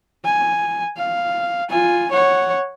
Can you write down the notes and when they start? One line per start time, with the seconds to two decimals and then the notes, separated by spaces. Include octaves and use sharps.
0.24 G#5
0.97 F5
1.69 F4 G#5
2.12 C#5 F#5